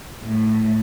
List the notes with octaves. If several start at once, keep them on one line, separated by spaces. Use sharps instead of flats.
A2